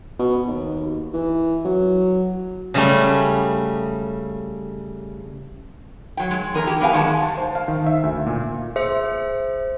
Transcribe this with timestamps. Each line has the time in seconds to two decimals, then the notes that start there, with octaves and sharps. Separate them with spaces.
0.19 B2
0.48 D#2
1.14 E3
1.65 F#3
2.74 C#3 G3 A3
6.17 F#3 G5
6.31 G#3
6.54 E2 G#4 A#4
6.67 G4
6.81 B3 A#4 B4 F5 G#5
6.93 D#3 G#3 F#5 A5
7.23 A5
7.38 C5
7.55 F5
7.68 D#3
7.87 E5
8.03 D2
8.26 A#2
8.76 G#4 C5 E5